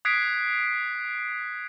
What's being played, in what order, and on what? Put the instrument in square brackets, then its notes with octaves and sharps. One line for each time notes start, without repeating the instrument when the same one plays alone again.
[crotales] D#6 F#6 G#6 B6 C7 D7